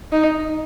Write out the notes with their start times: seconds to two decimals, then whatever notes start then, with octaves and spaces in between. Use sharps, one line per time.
0.12 D#4